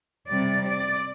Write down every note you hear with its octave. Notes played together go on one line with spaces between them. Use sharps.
C3 G3 D5
D5